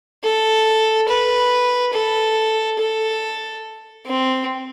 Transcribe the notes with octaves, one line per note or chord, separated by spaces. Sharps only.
A4
B4
A4
A4
C4